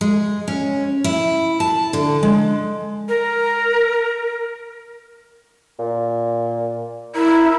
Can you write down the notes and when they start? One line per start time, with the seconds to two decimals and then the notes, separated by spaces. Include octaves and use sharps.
0.01 G#3
0.48 C#4
1.04 E4
1.60 A5
1.93 D3
2.23 G#3
3.09 A#4
5.79 A#2
7.15 E4 A#4